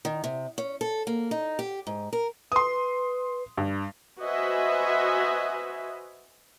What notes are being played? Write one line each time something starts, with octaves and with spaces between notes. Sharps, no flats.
D#3
C3
C#4
A4
A#3
D#4
G4
G#2
A#4
B4 C6 D#6
G2
F#4 B4 C5 D#5 E5 G#5